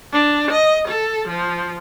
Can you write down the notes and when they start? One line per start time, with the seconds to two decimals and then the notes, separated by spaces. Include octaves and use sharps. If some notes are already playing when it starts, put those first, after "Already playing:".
0.13 D4
0.51 D#5
0.89 A4
1.28 F3